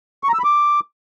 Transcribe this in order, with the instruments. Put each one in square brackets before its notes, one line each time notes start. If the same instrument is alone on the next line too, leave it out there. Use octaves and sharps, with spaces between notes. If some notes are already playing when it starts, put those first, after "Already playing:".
[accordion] C#6
A#5
E6
B5
D6